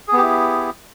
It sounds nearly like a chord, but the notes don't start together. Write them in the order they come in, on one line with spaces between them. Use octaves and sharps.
G#4 B3 G4 E4